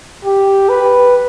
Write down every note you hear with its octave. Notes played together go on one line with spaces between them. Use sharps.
G4
B4